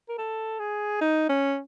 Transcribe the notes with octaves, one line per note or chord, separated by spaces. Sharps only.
A#4
A4
G#4
D#4
C#4